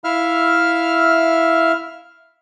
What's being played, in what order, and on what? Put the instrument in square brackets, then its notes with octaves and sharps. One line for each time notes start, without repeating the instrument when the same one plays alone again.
[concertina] E4 E5 F5 F6